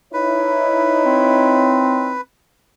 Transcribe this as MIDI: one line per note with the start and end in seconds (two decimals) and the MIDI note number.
0.13 2.14 63
0.13 2.14 64
0.13 2.21 71
0.13 2.14 73
1.05 2.20 60